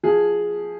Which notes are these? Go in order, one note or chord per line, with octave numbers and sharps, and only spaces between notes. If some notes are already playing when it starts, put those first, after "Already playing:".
F3 G#4